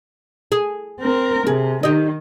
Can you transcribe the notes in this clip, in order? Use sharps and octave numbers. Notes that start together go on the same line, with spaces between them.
G#4
C4 A#4
C3 G#4
D#3 G4 D#5